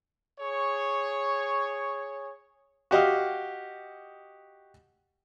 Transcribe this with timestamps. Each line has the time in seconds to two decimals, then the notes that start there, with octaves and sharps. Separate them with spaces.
0.40 G#4 C#5 C#6
2.91 F#4 G4 D#5 F5